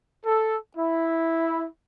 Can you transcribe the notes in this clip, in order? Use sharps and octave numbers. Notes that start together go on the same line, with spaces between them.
A4
E4